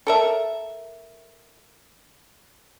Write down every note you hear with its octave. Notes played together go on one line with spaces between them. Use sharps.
A4 A#4 E5